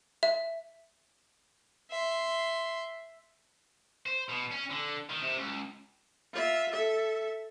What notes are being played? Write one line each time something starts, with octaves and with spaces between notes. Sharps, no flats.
E5
E5 C6
C5
B2
C#4
D3
D#3
C3
C#2
F4 E5
A4 E5